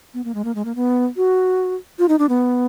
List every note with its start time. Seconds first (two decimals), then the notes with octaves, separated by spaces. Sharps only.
0.14 B3
0.25 A#3
0.35 G#3
0.45 A#3
0.55 G#3
0.65 A#3
0.76 B3
1.17 F#4
1.99 F4
2.09 D#4
2.19 D4
2.29 B3